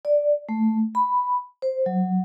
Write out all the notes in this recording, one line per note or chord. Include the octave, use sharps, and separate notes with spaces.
D5
A3
B5
C5
F#3